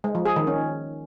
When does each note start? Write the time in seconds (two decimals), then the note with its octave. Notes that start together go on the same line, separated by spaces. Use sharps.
0.04 G#3
0.15 F3
0.26 G#4
0.36 D#3
0.47 C#4